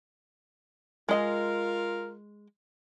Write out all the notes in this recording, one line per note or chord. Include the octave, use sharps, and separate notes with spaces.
G#3 F4 A#4 D#5 G#5